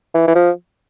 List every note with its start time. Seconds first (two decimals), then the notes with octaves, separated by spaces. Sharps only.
0.14 E3
0.28 E3
0.35 F3